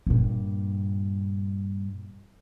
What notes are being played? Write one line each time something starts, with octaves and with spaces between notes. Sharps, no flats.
G2 A#2